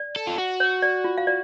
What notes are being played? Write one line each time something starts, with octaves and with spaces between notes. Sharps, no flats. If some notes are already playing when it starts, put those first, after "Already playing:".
Already playing: D5
A4
F4
F#4
C#5
D5
F4
F5
D5